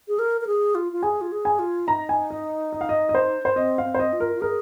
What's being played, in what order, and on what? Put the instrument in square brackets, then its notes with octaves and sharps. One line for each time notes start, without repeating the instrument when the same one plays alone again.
[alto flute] G#4
A#4
A#4
G#4
F4
F4
[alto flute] G#4 [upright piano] G#5
[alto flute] F4
G#4
[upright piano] G#5
[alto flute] F4
[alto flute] D#4 [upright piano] A#5
[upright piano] G#5
D#5
D#5
F5
D#5
D#5
C5
C5
[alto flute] C4 [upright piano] D#5
[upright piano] F5
[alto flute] C4
[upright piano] C5
D#5
[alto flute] F4
[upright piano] A#4
[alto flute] F4
[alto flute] G#4 [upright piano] A#4